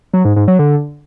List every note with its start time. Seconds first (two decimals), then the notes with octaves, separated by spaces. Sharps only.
0.13 F#3
0.25 G#2
0.36 G#2
0.48 F#3
0.59 D3